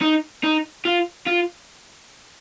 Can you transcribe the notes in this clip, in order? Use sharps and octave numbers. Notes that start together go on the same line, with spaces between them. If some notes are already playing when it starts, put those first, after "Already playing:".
D#4
D#4
F4
F4